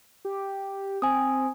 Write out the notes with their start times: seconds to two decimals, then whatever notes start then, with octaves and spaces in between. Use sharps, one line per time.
0.25 G4
1.02 C4 G#5 D#6